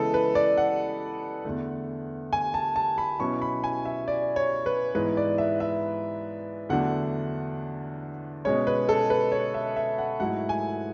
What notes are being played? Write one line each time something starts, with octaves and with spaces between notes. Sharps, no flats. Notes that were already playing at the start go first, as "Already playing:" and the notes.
Already playing: C#3 E3 G#3 B3 E4 A4 B4
B4
D5
F#5
E2 D3 A3
G#5
A5
A5
B5
B2 F#3 C#4 E4 C#6
B5
G#5
E5
D5
C#5
B4
G#2 E3 B3 E4 B4
D5
E5
E5
E2 D3 F#3 A3 D4 F#5
B2 G#3 C#4 C#5
B4
A4
B4
C#5
E5
E5
F#5
G#2 F#3 A3 E4 F#5
G#5